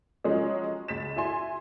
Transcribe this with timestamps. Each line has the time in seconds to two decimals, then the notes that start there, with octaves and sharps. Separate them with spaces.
0.24 F3 F#3 G#3 C#4
0.88 C#2 A6 B6 E7
1.16 E4 F#4 G#5 C6